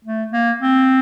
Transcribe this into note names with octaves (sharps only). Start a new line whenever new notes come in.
A3
A#3
C4